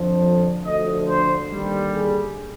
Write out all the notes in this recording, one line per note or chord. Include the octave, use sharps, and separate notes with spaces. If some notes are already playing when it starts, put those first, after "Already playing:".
Already playing: F2 D3 F3
D2 D3 F3 D#5
C5
D#2 D3 G3
G#4